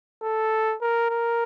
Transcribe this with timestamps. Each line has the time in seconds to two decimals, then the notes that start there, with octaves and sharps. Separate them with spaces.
0.22 A4
0.82 A#4
1.10 A#4